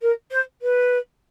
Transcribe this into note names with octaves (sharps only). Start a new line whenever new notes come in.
A#4
C5
B4